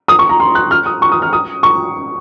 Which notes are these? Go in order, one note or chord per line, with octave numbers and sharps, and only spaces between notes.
D#6
C#6
A#5
C6
F#6
F6
D#6
C#6
D#6
F6
D#6
C#6